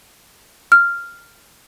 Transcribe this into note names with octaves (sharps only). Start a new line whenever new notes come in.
F6